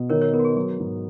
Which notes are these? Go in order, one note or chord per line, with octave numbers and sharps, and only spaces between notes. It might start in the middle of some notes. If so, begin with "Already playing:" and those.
Already playing: B2
D#3 A#4 C#5
A#4 C#5
B3 A#4
F#4
G#4
F#3 G#4
G#2